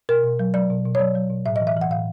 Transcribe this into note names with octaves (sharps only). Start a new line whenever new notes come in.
B2 A#4
B2
F#3
F#3 D5
B2
B2
C#5
F#3 D5
F#3
B2
A2 E5
E3 D#5
E5
E3 F#5
A2 F5